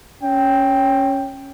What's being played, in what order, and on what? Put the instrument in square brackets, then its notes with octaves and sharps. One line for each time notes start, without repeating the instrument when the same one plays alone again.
[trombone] C#4 [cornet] G5